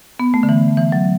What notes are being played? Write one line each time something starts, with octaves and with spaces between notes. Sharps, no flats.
B3
A3
D3
E3
E3
F#3